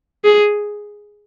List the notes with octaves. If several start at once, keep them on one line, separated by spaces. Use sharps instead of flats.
G#4